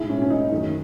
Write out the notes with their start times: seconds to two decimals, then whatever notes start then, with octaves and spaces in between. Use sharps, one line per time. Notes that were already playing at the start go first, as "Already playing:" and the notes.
Already playing: B1 A2 G#3 E4
0.09 C#4
0.22 C#4
0.30 D#4
0.52 F#2 D#3 A3